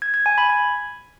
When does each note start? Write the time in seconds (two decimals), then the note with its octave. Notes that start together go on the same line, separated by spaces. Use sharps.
0.02 G#6
0.14 G#6
0.26 G#5
0.38 B5
0.50 G#6